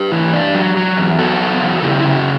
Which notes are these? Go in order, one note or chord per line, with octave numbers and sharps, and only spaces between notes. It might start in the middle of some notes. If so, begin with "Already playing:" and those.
Already playing: G4 B4
E3
D4
F#3
F#3
E2
B3 F#4 A4
F#3
E2
C#3 E4 G4
E4
C#3
F#4